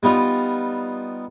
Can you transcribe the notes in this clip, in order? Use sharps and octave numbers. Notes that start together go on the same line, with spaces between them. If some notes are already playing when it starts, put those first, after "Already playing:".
G3 B3 D#4 F4